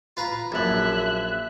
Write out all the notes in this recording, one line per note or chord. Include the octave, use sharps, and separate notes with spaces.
F4 B4 A#5
A#1 F#2 E5 F#6